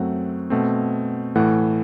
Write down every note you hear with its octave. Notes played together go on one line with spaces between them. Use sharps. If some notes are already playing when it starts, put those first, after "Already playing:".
Already playing: F#2 F#3 A3 C4 F#5
B2 A3 C4
A2 E3 A3 F#5